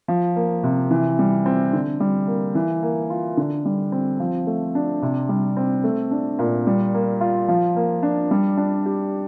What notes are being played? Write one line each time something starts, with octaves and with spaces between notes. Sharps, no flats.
F3
A#3
C3
E3
G3
C4
D3
G3
A#3
E3
A#3
F4
D3
G3
C4
F3
A3
D4
C3
G3
C4
A3
D4
A#2
G3
A#3
F4
F3
A#3
D4
G3
D4
G4